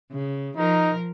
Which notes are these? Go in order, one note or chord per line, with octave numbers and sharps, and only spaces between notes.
C#3
F3 D#4 A#4